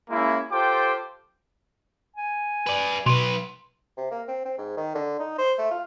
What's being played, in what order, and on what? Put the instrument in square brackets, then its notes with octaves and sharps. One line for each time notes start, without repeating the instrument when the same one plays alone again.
[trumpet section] G#3 A#3 C#4 E4
F4 G4 A4 C5 G5 D6
[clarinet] G#5
[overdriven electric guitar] B4 D5
[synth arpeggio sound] B2 [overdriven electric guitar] F#3 B4 [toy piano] C6
[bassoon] C3
A#3
C4
C4
G#2
D#3
D3
D#4
C5
A3
F4